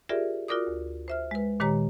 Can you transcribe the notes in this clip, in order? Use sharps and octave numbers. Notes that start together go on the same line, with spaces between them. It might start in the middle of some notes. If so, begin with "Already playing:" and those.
F4 G4 G#4 A#4 D5 E5
F4 F#4 A#4 D5 D6 D#6
D2
C5 E5 F6
G#3 B4
A#2 D#3 G#3 G4 C#5 A#5